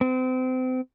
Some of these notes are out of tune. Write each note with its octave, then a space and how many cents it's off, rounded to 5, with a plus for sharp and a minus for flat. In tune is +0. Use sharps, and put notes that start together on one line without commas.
C4 -35